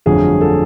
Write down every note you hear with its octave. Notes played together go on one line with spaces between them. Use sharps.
G1 F2 D3 F#3 A3 G#4
A4